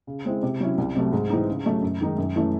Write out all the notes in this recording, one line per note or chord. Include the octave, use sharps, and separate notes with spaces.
C#3
G#3 C4 E4
C3
F#3 C#4 E4
C2
C3 F#3 A3
G#2
E3 C4 D#4
C#3
F#3 A3 C#4
F#2
D#3 G#3 D#4
F#2
E3 A3 C#4